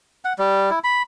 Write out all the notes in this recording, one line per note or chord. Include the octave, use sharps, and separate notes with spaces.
F#5
G3
E4
B5